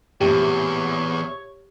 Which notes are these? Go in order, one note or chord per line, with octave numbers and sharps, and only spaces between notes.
A#1 E2 A2 C3 G4 C#5